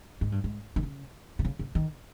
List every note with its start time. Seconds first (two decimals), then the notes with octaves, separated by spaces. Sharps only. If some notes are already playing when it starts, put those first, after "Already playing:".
0.21 G#2
0.32 G2
0.44 G#2
0.76 D#3
0.83 C#3
1.39 C3
1.45 C#3
1.59 C#3
1.75 D#3